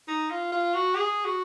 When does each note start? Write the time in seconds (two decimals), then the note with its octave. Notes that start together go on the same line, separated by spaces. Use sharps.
0.08 D#4
0.31 F4
0.52 F4
0.74 F#4
0.95 G#4
1.25 F#4